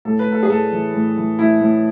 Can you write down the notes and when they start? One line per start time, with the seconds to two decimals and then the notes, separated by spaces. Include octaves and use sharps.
0.05 A2 A4
0.19 B4
0.27 A2 A4
0.43 G#4
0.49 A2 A4
0.72 E3
0.94 A2
1.17 E3
1.39 A2 E4
1.61 A2